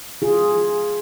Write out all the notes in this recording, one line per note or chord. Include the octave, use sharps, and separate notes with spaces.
F4 G#4